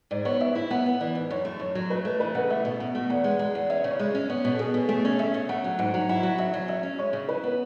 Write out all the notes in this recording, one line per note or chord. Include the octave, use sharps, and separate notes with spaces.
G#2 D5
B3 C#5
G#2 E5
E4
B3 F#5
B3
E3 D5
G#2
F#2 C#5
A3
F#2 C#5
F#3
A3 B4
A3
E3 B4
C#3 F#5
A3 E5
B2
B2 F#5
A3
E2 F#5
G#3
G#3 F#5
E2
C#4 E5
C#3
C#5
G#3 D5
C#4
B3 C#5
B2 C#5
A4
B2 G#4
B2
A3 G#4
C#4 C#5
C#4 E5
C#3
A3 F#5
F#3
G#2 F#5
F#3
E4 F#5
F#3
C#3 E5
F#3
C#4 E5
C#4
G#3 C#5
C#3
E4 B4
B3